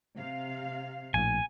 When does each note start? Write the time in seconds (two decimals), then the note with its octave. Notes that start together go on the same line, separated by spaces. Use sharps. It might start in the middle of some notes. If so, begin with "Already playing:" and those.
0.16 C3 F5
1.14 A#1 A2 G#5